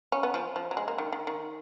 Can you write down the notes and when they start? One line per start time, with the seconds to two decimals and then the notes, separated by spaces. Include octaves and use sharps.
0.12 C#4
0.23 B3
0.34 F3
0.56 F3
0.71 F#3
0.77 G#3
0.88 A#3
0.98 D#3
1.12 D#3
1.27 D#3